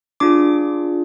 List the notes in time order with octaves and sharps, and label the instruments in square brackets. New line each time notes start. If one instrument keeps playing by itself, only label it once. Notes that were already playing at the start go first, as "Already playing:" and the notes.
[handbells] D4 F4 G#4 D6